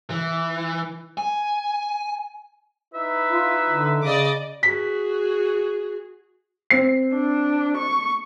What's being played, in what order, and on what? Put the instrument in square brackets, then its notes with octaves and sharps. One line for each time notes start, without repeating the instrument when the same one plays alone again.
[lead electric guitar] E3
G#5
[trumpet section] D#4 E4 B4 [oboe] E5
[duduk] F4
D3
[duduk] C#3 [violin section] D5 D#5 D6
[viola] F#4 G#4 [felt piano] B6
[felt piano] C4 C7
[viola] D4
C#6